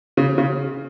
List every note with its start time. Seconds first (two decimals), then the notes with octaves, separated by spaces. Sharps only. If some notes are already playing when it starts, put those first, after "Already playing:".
0.17 C#3
0.38 C#3